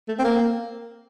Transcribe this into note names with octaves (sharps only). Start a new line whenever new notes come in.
A3
C4
A#3